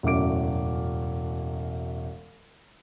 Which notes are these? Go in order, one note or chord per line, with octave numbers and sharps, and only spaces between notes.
E1 F#2 A2 C#4 D6 D7